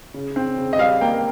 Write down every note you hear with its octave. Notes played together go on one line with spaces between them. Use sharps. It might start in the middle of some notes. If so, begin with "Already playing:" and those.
C#3
C4
C#3
D#5
G3 F5
A#3 G5